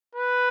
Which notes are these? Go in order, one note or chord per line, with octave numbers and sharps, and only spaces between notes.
B4